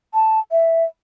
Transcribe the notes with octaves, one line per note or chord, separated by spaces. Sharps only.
A5
E5